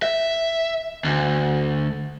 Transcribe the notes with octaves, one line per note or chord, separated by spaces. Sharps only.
E5
D2